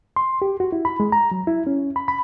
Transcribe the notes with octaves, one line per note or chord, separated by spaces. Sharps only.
C6
G4
F#4
E4
B5
G#3
A#5
F#3
E4
C#4
B5
B5